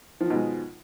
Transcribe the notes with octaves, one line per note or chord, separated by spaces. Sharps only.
B2 D#3 F3 G#3